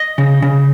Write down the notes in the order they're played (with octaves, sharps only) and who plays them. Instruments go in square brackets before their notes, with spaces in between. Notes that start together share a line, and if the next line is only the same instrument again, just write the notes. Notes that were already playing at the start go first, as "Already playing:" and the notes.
Already playing: [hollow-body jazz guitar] D#5
C#3
C#3